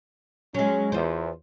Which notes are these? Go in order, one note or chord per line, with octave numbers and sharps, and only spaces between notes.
F#3 G#3 C#4
E2 F4 C5